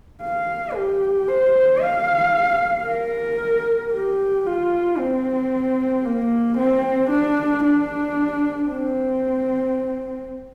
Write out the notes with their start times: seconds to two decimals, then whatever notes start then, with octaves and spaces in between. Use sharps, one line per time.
0.22 F5
0.75 G4
1.28 C5
1.81 F5
2.87 A#4
3.93 G4
4.46 F4
4.98 C4
6.05 A#3
6.57 C4
7.10 D4
7.64 D4
8.69 C4